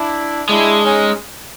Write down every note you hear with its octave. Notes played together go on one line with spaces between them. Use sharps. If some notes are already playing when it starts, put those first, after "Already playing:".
Already playing: D4 E4
G#3 D4 E4
C#4 D#4